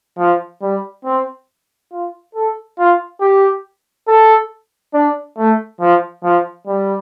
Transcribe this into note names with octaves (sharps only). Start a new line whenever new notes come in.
F3
G3
C4
F4
A4
F4
G4
A4
D4
A3
F3
F3
G3